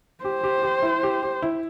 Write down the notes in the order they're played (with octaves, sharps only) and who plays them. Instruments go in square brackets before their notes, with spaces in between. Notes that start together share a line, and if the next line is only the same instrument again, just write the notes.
[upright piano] G4 [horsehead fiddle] C5
[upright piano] G4
G4
E4
G4
G4
E4